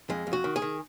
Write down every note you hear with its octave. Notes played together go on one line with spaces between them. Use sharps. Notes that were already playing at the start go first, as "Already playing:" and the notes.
F2 G#3
F2
F#4
D#3
G#4
D#3